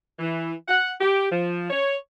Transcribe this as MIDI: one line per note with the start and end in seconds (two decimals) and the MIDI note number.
0.19 0.53 52
0.68 0.91 78
1.01 1.28 67
1.32 1.66 53
1.70 1.95 73